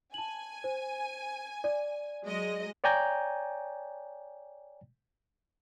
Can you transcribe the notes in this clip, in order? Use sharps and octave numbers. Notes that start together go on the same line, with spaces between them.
G#5 A5 F#7
C5
D5
F#3 G#3 D#5
C#5 D5 G5 G#5 A#5 G6